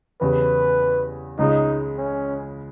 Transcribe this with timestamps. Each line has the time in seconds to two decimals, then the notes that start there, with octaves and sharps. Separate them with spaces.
0.21 E2 C#3 G3 B4
1.39 C#2 C#3 G#3 D#4
1.97 C#4